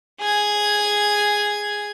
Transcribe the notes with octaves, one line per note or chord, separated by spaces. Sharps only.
G#4 G#6